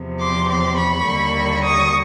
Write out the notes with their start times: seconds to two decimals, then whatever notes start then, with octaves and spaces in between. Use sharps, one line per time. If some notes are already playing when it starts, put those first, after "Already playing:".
Already playing: E2 C3 F3
0.19 C6 D6
0.48 C6 D6
0.77 B5 C#6
1.06 D#2 D3 G3 A#3
1.64 C#6 D#6